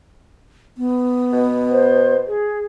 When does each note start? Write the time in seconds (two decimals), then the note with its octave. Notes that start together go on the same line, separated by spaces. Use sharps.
0.77 B3
1.33 B2
1.71 C5
2.27 G#4